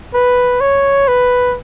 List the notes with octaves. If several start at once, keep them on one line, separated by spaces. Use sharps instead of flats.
B4
C#5
B4